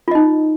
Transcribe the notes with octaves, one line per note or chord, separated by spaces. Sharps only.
D#4 F4 D#5